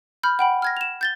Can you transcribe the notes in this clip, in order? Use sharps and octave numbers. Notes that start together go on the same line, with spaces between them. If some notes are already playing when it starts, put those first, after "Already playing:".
B5 F6 G6
F#5 G5 B5
F6 G#6 A#6
E7 F7
G6 A6 G7